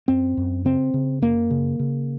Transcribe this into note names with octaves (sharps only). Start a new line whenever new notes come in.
F#2 C4
F#2
C#3 C4
C#3
F#2 A#3
C#3
C#3